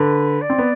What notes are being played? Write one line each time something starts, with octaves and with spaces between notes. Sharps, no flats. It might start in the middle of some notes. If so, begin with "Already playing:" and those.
Already playing: D3 B4
D5
C4
B3